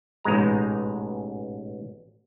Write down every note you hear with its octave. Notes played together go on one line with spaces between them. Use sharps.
A1 G#2 B2 G#3 A#5